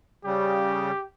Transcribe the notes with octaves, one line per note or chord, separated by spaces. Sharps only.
C#3 G3 G4